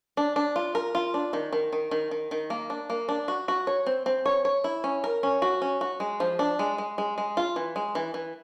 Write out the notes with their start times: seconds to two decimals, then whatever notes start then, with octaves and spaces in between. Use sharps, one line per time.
0.17 D4
0.36 D4
0.56 F4
0.75 A#4
0.95 F4
1.14 D4
1.33 D#3
1.53 D#3
1.73 D#3
1.91 D#3
2.11 D#3
2.31 D#3
2.50 A#3
2.70 D4
2.90 A#3
3.09 D4
3.28 F#4
3.48 F#4
3.67 C#5
3.87 C4
4.06 C4
4.26 C#5
4.45 C#5
4.64 E4
4.84 C#4
5.04 A#4
5.23 C#4
5.42 F#4
5.62 C#4
5.81 F#4
6.00 G#3
6.20 F3
6.39 D4
6.59 G#3
6.78 G#3
6.98 G#3
7.18 G#3
7.37 F4
7.56 E3
7.76 G#3
7.95 E3
8.14 E3